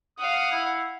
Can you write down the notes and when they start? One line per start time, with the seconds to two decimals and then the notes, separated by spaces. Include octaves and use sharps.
0.18 F5 F#5 D#6
0.52 E4